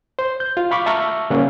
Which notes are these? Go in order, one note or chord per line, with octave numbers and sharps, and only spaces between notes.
C5
G6
F4
F5 B5 C#6 D6
E5 A5 A#5 C#6 E6 F6
C#3 G3 A#3 C#4